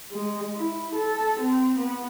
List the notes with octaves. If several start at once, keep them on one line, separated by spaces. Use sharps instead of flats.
G#3
E4
A4
C4
B3